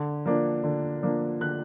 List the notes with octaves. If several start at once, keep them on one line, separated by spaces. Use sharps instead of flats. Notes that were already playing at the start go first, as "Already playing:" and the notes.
Already playing: D3
F3 A#3 D4
D3
F3 A#3 D4
D3 F#6